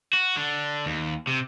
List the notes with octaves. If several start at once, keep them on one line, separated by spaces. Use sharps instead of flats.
F#4
D3
D#2
C3